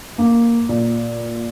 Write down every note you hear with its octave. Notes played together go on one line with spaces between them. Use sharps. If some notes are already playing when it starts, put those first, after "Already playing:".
A#3
A#2